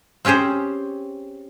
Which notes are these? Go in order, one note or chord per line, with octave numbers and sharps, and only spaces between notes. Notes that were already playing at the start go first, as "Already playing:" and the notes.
C4 C#4 G4 G#4 C5